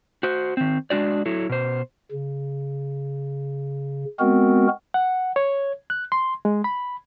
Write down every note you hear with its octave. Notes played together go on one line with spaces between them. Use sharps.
F#4 C5
D#3 C4
G#3 D4 F#4 D5
F#3 E4 A4
B2 C5
C#3
G#3 B3 C4 F#4 A#4
F#5
C#5
F#6
C6
G#3
B5